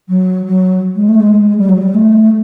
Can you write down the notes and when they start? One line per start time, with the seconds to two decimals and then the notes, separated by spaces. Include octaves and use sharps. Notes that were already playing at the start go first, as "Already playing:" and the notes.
0.08 F#3
0.46 F#3
0.95 G#3
1.08 A3
1.19 G#3
1.58 G3
1.69 F#3
1.82 G3
1.94 A3